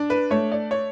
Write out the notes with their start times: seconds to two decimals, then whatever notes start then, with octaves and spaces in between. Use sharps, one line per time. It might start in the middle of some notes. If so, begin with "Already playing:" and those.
Already playing: D4
0.10 B4
0.31 A3 C#5
0.52 D5
0.71 C#5